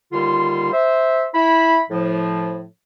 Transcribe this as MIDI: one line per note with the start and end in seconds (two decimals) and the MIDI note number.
0.13 0.70 39
0.13 0.70 50
0.13 0.70 55
0.13 0.70 65
0.13 0.70 84
0.73 1.25 72
0.73 1.25 76
1.35 1.80 64
1.35 1.80 83
1.90 2.64 45
1.90 2.64 53